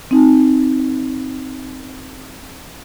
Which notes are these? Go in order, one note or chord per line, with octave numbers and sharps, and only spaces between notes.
C4 D#4